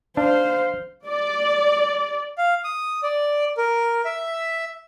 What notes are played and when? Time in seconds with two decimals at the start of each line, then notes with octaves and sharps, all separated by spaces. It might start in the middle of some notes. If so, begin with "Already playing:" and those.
0.17 D4 C5 F5
1.07 D5
2.38 F5
2.64 D#6
3.03 D5
3.57 A#4
4.05 E5